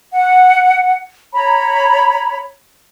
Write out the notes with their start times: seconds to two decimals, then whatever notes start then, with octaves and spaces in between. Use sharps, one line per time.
0.13 F#5
1.34 C#5 A#5 B5